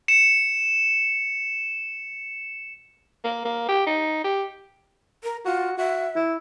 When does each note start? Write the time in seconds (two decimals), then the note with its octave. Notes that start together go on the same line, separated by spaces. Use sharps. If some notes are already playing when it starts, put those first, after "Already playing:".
0.08 C#7 E7
3.24 A#3
3.45 A#3
3.69 G4
3.87 D#4
4.24 G4
5.23 A#4
5.46 F4 F#4
5.78 F#4 E5
6.16 E4